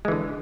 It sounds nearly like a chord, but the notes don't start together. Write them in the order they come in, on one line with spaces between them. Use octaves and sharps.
G#3 E3 D3